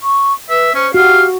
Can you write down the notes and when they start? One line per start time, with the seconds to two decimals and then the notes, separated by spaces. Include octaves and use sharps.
0.03 C#6
0.50 B4 E5
0.74 C#4 C5
0.94 F#4 G4 F5